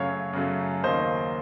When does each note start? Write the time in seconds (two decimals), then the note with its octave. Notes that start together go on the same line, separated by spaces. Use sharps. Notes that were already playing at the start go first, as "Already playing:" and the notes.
Already playing: F#2 C#3 F#3 A3 C#5 F5
0.33 F#2 C#3 F#3 A3
0.83 D#2 C#3 F#3 A#3 C5 D#5